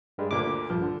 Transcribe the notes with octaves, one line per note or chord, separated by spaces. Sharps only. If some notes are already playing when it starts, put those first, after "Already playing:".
G2 G3 G#3
D2 A#2 D3 D6
A#1 G2 F3
D3